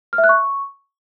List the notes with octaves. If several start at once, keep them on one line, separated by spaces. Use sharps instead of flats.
F6
E5
F#6
C#6